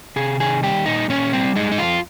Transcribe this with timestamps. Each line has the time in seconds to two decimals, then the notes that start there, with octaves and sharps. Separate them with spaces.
0.16 C3 G#4
0.40 D#3 G#4
0.63 G3 G4
0.86 A#2 D#4
1.09 A#2 C#4
1.33 G3 C4
1.56 G#3 D#4
1.72 D#4
1.78 F2 F4